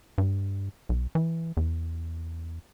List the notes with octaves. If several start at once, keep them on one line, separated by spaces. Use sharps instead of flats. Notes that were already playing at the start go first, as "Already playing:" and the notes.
G2
B1
E3
E2